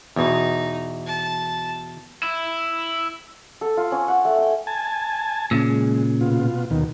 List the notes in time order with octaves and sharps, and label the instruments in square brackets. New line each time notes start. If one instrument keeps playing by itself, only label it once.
[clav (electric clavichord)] E2 B2 [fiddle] D#4
[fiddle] A5
[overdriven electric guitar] E4
[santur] A4
F4
C#4
F#5
A3
G5
[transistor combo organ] G#5 A5
[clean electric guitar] A#2 C#3
[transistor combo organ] G#3
B2 F4
D#2 B2 D#3